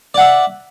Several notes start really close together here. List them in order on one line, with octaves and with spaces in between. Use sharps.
D5 F#5 E5